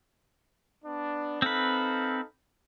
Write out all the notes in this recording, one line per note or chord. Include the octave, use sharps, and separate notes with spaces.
B3 D4
C4 D#4 A4 B4 F5